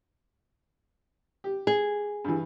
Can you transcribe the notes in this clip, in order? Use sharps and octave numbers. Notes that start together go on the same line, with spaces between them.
G4
G#4
G2 E3